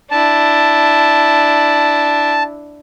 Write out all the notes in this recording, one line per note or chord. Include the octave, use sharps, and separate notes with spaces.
D4 E4 A5